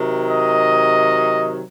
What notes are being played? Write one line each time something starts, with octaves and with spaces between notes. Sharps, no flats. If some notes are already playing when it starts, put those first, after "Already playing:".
Already playing: C3 D#3 F#3
D#5